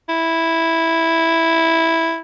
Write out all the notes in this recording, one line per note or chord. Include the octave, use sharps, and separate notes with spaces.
E4